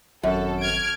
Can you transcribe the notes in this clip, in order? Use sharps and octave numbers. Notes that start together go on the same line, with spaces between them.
G#1 F#2 A4
F6 G#6 D7